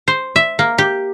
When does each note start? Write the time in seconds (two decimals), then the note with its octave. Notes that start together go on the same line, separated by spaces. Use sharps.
0.08 C5
0.36 E5
0.59 A#3
0.78 G4